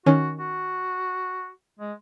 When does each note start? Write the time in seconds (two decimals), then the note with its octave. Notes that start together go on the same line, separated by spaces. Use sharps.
0.06 D#3 C#4 F#4
0.40 F#4
1.80 G#3